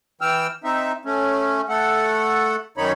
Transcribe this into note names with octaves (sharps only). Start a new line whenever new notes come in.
E3 G5 E6 F6
C4 D#4 E5
A3 C#4
A3 A4 F#5
F#2 D#3 D#4 C#5 B5